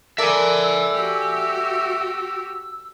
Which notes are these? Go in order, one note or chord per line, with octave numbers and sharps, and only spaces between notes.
A4 A#4 D5 E5 G#5 E6
F#4 G4